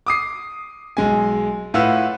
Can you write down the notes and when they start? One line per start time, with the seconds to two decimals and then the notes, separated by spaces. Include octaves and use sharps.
0.06 D6 D#6 C7
0.97 B1 G#3 G#5
1.74 A2 F4 B4 F#5 E6